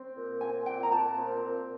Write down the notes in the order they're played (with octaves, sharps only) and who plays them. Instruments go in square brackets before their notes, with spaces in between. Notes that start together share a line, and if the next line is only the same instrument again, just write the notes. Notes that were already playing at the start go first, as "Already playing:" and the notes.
Already playing: [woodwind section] C4
A#2
[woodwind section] C4 [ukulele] G#5
[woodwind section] A#2 [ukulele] G5
[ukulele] A#5
[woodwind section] A#2 [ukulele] A5
[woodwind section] C4
A#2